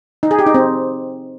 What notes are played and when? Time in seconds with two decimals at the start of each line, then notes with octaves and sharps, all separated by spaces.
0.23 D#4
0.31 G#4
0.39 G4
0.47 D#4
0.54 C4